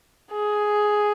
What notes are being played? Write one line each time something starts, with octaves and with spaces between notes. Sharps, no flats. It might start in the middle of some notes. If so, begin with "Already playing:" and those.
G#4